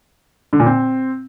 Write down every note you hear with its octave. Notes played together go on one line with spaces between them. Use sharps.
D3
A#2
C4